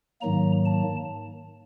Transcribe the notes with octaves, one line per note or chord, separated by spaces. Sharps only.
G#2 D#3 F#3 A#3 A#5
A5